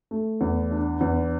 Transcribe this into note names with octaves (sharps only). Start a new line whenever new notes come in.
A3
E2
D4
E2